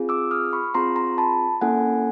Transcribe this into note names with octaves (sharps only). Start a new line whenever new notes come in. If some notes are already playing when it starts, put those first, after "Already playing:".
Already playing: C4 F4 G#4
D6 E6
D#6 F6
B5 C#6
C4 F4 G#4 A#5 C6
A#5 C6
A5 B5
A#3 C#4 E4 A4 F#5 G#5